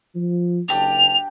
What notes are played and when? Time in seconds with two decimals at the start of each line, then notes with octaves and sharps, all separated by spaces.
0.15 F3
0.68 F#1 D4 G4 F7